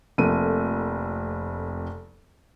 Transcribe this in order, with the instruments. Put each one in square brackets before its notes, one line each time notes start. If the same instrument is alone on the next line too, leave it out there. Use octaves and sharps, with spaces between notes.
[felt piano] F1 F2 A3 A#3 D#7